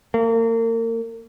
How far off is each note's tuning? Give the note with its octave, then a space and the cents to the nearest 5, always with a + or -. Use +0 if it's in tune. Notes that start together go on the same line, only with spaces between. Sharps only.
A#3 -35